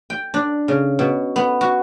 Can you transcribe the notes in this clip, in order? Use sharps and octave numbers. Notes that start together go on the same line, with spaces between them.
G5
D4
C#3
B2
B3
F#4